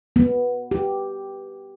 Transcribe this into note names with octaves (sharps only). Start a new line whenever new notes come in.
B3
G4